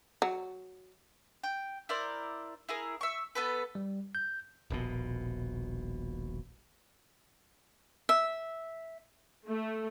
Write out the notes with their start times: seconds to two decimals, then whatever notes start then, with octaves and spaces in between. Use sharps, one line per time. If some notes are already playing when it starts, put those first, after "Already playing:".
0.22 F#3
1.43 G5
1.89 E4 A#4 C5 D5
2.69 E4 G#4 A#4
3.01 E5 C#6
3.35 B3 A4 B4
3.75 G3
4.15 G6
4.70 D#1 A#1 B2
8.09 E5
9.47 A3